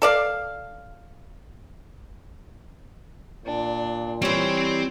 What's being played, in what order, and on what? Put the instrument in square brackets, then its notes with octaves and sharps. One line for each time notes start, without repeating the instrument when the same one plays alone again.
[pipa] A4 D5 F5
[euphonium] A#2 [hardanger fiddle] D4
[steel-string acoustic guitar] E3 G3 [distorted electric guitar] C4 C5 [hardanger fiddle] C#5